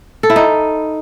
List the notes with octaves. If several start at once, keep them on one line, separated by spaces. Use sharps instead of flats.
A4
E4
D#4